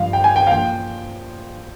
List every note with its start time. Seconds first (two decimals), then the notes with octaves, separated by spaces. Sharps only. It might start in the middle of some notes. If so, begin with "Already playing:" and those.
Already playing: G2 F3 F5
0.13 G5
0.24 G#5
0.36 G5
0.47 F5
0.51 A#2 F3 G5